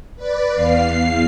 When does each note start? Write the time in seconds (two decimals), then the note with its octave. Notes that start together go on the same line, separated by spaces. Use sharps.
0.16 B4 D5
0.55 E2 F5 C7